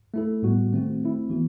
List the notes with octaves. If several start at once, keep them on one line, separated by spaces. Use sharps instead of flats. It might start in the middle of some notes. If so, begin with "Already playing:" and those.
A3 E4 A4
A2 G3 B3 F#4
D#3 A3 C4 F#4
A3 C4 E4
E3 B3 F#4